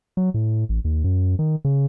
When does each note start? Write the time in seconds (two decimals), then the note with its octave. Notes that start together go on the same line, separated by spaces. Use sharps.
0.17 F#3
0.34 A2
0.69 A1
0.85 D#2
1.04 F#2
1.39 D#3
1.65 C#3